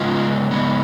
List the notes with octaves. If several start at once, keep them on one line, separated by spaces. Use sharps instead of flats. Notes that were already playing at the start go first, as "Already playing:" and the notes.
Already playing: C#3 G#3 B3 F4
C#3 G#3 B3